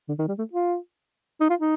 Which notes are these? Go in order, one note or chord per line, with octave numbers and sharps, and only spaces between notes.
D3
D#3
G3
A3
F4
D#4
F4
D#4